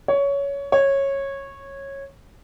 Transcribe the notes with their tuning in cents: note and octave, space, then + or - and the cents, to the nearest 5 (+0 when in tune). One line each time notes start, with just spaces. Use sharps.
C#5 +15
C#5 -15